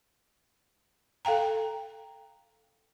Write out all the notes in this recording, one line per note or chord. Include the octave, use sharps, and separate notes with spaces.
A4 F5 G5 A#5